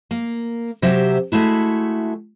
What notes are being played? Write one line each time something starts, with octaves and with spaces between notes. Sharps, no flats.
A#3
C3 F#3 G4 C5 E5
G#3 A3 E4 F#4